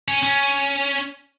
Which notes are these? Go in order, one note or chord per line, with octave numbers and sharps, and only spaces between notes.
C#4
C#4